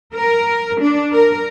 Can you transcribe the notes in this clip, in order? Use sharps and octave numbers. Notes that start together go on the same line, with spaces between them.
A#4
D4
A#4